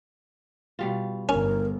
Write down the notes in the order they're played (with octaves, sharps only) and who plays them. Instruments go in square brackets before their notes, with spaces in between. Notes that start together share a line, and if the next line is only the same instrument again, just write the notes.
[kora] B2 G3 F4
[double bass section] G1 [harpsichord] C#4 [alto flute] A#4